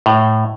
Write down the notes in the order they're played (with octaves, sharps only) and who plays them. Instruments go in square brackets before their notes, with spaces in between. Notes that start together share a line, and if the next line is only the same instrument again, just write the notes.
[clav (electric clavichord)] A2